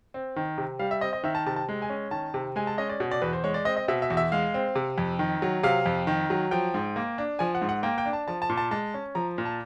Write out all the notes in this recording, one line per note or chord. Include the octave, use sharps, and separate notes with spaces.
C4
D#3
C3
G3 F5
E5
C4 D#5
D#5
D#3 E5
A5
C3 A5
A5
G#3
G#5
C#4
D#3 A5
C3
G#3 G#5
A5
C#4 D#5
D5
B2
D5
E2 B4
C5
G#3 C#5
D5
C4 D#5
D#5
B2 E5
E5
E2
E5
G#3 F5
C4
C3
F2
D#3
F#3
C3 F5
F2
D#3
F#3
F3 G5
G#2
A#3
D4
F3 G#5
F#5
G#2
F#5
A#3 G5
G5
D4
A5
F3 A5
A5
A#2
A5
G#3 A5
C#4
F3 A#5
A#2
A5